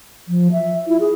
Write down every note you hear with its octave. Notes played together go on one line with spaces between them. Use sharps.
F3
E5
E4 F4
G#4